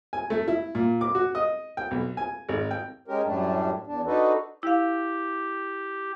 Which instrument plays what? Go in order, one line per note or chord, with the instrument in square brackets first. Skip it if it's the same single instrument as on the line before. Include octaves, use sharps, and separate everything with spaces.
[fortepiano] G#5
A3
E4
A#2
D6
F#4
D#5
G5
B1
G#5
G#1
G5
[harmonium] G#3 C#4 G4 A#4
F#2 A2 G3 A3 D4
E2 D4
D4 D#4 F#4 A4 B4
[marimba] E4 F5 [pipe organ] G4